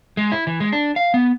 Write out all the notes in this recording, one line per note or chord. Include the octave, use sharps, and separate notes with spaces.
G#3
E4
E3
G#3
D4
F5
B3